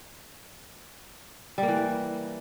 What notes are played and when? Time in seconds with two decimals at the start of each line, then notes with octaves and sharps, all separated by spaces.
1.58 G3
1.63 A#3
1.68 E3